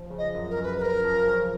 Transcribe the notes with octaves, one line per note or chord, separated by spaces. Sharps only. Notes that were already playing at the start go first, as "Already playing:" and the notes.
Already playing: F3
C#3
D#5
F#2
A#4
F#2
B4
B4
F#2 A#4
F3
C#3